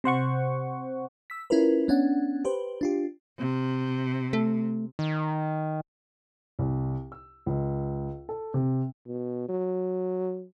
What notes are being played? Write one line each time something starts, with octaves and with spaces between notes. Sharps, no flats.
C3 C5 F#5 C#6
E6 B6
C#4 E4 F4 A#4 B4
B3 C#4 D4 F#5
G4 B4 C5
D4 F4 G4
C3
A3
D#3
C2
E6
C#2
A4
C3
B2
F#3